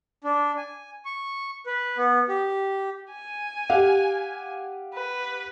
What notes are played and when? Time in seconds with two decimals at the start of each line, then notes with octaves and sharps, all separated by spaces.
0.24 D4
0.57 G#5
1.05 C#6
1.66 B4
1.98 B3
2.29 G4
3.12 G#5
3.69 G4 F5 F#5
4.94 B4